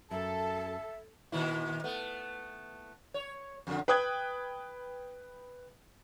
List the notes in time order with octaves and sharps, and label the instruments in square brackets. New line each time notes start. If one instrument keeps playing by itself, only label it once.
[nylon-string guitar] F#2 [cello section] A4 [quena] E5 [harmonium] A5
[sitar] A#2 D#3 E4
A3 B3
C#5
F2 D3
[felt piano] B4 G5 D#6 F#6 G#6